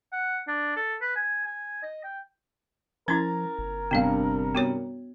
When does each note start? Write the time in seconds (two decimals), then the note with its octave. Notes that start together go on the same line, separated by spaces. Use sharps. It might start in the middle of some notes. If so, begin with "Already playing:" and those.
0.13 F#5
0.48 D4
0.77 A4
1.02 B4
1.16 G#5
1.45 G#5
1.83 D#5
2.04 G5
3.08 F3 C#4 E4 A#4 A#5 G#6 A6
3.59 G1
3.91 G2 C3 B3 D4 F5
4.55 B3 F#4 C#5